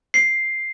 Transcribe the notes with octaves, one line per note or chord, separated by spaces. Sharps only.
C7